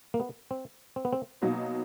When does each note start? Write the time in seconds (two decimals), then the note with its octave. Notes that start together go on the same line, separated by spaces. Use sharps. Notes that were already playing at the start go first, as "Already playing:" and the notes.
0.14 A#3
0.20 B3
0.51 C4
0.96 C4
1.05 B3
1.13 C4
1.42 B2 F#3 A#3 D#4